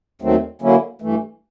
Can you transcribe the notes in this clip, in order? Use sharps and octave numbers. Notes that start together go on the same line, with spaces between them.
D#2 D#3 F#3 A3 C4
D3 F#3 A#3 C#4 E4
G2 E3 A3